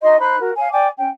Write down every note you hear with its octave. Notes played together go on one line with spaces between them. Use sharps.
D#4 F#4 D#5 C6
D#4 C5 B5 F#6
F#4 A#4
C#5 F5 G#5
D5 G5 G#5 D6
C#4 G5